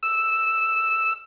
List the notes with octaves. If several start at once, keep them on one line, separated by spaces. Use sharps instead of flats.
E6